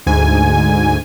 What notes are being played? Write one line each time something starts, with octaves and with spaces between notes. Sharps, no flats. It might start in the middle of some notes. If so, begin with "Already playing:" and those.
D2 G#2 G#5